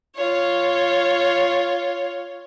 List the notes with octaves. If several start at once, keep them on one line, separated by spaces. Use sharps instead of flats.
F4 C#5